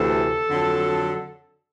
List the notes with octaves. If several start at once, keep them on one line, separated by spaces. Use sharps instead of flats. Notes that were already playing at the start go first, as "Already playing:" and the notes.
Already playing: D2 C3 E3 A4
F2 D3 F#3